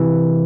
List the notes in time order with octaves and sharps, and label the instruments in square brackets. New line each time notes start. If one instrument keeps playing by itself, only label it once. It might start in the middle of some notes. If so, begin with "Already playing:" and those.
Already playing: [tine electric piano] C3 E3